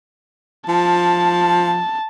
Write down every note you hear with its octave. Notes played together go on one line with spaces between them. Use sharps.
F3 A5